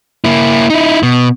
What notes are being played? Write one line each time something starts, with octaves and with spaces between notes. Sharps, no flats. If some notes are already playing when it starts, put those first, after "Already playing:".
A#3 E4
D#4 E4
B2